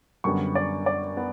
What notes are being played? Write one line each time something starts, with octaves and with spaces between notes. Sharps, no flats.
F#2 D3 G3 B3 C#6
D5
D5
B3